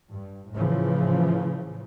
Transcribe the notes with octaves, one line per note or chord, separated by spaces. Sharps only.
G2
A2 C#3 E3 F3